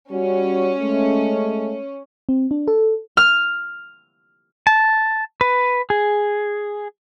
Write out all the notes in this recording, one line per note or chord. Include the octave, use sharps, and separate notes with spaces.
G3 C#4 F#4
G#3 A3
C4
D4
A4
F6
A5
B4
G#4